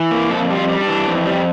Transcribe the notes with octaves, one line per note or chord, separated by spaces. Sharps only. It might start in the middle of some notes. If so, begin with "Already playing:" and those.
Already playing: E3
A#3
F2 A4
G3
F4
G3
D4
E3
F2
G3